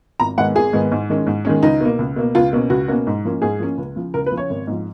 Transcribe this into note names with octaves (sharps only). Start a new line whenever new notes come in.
G#1 A#5
G#2 D#3 G#3 B3 F#5
G#1 G#4
G#2 D#3 G#3 B3
G#2
D#3 G#3 C#4
G#2
D#3 G#3 C#4
C#2 D#4
B2 A#3
C#2
B2 A#3
C#2 F4
B2 A#3 C#4
C#2 F#4
B2 A#3 C#4
G#2
F3 A#3 C#4
G#2 G#4
F3 A#3 C#4
C#2
C#3 F3
C#2 A#4
B4
C#3 F3
C#5
G#1
G#2 F3